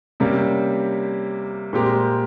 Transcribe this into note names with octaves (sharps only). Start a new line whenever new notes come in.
C3 G3 A#3 C#4
A#2 G#3 C4 G4 A#4